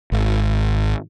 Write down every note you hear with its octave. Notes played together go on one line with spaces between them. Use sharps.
G#1